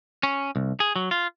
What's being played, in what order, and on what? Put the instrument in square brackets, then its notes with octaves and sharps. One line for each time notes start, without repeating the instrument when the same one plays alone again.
[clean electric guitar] C#4
C2
G#4
F#3
F4